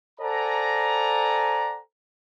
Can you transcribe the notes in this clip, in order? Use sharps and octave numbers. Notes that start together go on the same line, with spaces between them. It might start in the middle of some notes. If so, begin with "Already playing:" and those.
A4 C5 D5 F#5 G#5 A#5